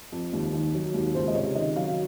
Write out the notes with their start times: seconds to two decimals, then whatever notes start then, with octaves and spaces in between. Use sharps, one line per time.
0.12 F2
0.33 D#2
0.54 D#3
0.75 F#3
0.94 D#2
1.15 C#2 C5
1.28 D#5
1.35 C3 C#5
1.55 D#3 D#5
1.76 F#3 F5